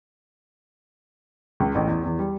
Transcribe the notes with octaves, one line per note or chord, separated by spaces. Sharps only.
C#2
A1
E2
E2
G3